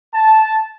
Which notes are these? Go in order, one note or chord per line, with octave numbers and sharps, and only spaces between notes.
A5